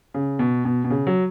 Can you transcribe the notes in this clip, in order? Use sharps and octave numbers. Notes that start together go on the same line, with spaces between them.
C#3
B2
B2
B2
C#3
F#3